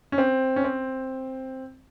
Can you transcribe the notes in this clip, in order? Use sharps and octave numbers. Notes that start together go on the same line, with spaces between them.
C#4
C4
C#4
C4